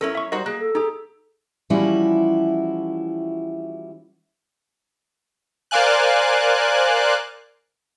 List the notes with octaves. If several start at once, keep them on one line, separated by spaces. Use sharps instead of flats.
F#3 C#4 E4 A4 A#4
E5 C#6
G3 D#4 F#4 A#4 C5 D#5 F#5
A#3 G#4 F#6
A4
D#4 G4 G#4
E3 F3 G3 C#4 E4 F#4
A#4 C5 D5 F5 G#5 F#6